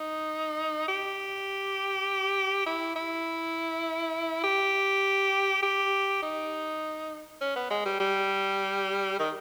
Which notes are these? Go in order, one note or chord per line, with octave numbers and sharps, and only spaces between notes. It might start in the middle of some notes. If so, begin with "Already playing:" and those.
Already playing: D#4
G4
E4
E4
G4
G4
D#4
C#4
B3
G#3
G3
G3
D#3